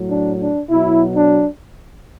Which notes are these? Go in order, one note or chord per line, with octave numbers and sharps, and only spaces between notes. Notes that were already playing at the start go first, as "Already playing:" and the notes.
Already playing: A2 F#3
D4
D4
B2 F#3 E4
D4